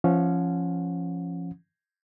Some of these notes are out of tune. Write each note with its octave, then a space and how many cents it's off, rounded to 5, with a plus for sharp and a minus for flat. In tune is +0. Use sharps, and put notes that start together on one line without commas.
F3 -20 C#4 -10 F#5 -40